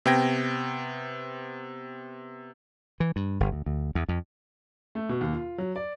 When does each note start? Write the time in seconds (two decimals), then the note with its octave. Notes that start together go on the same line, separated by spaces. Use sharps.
0.06 C3 B3 G5 G#6 A#6
3.00 E3
3.16 G2
3.40 G1
3.52 D2
3.66 D2
3.95 E2
4.09 F2
4.95 A3
5.09 B2
5.21 D#2
5.33 F4
5.58 F#3
5.76 D5